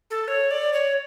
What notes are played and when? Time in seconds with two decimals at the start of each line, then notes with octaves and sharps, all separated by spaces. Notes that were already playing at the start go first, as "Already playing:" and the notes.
0.10 A4
0.28 C#5
0.51 D5
0.73 C#5